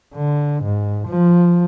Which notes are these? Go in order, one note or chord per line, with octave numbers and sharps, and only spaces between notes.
D3
G#2
F3